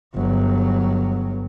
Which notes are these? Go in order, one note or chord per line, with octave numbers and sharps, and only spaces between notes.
G1 F#3